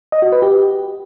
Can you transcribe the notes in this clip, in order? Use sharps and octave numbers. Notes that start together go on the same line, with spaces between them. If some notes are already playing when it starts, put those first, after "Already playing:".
D#5
F#4
B4
G4